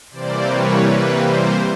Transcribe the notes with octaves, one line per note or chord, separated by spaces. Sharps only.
C3 E3 G3 A#3 C5 D5
B4 C#5
B4
C5